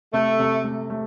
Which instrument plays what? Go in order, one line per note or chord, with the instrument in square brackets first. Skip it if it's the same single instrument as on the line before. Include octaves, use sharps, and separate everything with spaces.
[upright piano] C3 [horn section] A3
[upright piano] C3
A3
A3